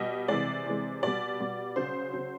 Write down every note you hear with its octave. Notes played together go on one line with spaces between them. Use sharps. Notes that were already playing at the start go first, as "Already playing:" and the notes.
Already playing: B2 G3 D#5
C3 E3 G#3 D5
C3 E3 G#3
B2 G3 D5
B2 G3
C#3 F#3 C5
C#3 F#3